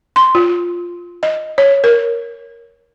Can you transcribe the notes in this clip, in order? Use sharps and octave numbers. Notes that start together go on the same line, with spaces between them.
C6
F4
D#5
C#5
A#4